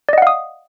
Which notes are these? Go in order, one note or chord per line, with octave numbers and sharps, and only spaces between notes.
D5 D#5 F5 F#5 D#6